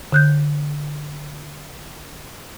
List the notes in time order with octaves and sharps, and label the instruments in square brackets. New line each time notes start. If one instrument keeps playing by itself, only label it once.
[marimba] D3 F#6 G6